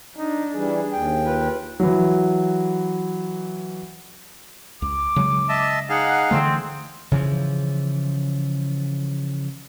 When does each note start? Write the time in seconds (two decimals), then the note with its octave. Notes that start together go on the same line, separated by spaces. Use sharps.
0.18 D4 D#4
0.55 E3 G3 G#4
0.92 D#2 G5
1.25 F4 B4
1.80 E3 F#3
4.82 C#2 D6
5.16 C#3 F#3 G#3
5.49 D#5 E5 A5
5.89 D#4 G#4 F5 F#5
6.31 D3 E3 A3 C4
7.12 C#3 E3 F3